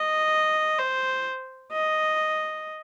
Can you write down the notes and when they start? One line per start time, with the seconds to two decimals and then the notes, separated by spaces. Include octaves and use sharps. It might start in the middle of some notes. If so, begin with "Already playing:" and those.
Already playing: D#5
0.79 C5
1.73 D#5